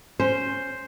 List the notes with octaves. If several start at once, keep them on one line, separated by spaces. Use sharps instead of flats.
C#4 C5